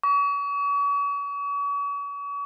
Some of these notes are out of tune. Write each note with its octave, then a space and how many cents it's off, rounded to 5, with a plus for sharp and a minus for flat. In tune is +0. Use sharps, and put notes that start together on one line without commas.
C#6 +40